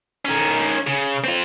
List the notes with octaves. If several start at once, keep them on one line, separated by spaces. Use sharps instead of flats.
D#3 C#4
C#3
C4 F4